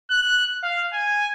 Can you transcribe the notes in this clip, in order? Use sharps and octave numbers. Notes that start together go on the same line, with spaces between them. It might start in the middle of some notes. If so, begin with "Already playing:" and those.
F#6
F5
G#5